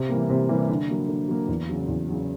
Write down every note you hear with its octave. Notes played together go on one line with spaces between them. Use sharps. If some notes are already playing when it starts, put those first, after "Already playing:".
Already playing: C3
E3 G3 A#3
C3
E3 G3 A#3
D3
F#3 A#3
D3
F#3 A#3
E2
C#3 F#3
E2
C#3 F#3